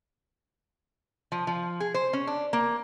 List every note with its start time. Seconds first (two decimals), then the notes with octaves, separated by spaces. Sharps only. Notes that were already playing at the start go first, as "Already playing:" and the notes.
1.32 F3
1.47 F3
1.80 G#4
1.94 C5
2.13 C#4
2.27 D4
2.53 A#3